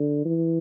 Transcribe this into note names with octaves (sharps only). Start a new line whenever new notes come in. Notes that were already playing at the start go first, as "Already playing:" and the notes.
Already playing: D3
E3